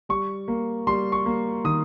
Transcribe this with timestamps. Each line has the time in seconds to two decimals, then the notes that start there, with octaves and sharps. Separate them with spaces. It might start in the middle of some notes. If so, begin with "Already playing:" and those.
0.09 G3 C#6
0.48 A#3
0.87 G3 C6
1.12 C#6
1.26 A#3
1.64 D#3 D#6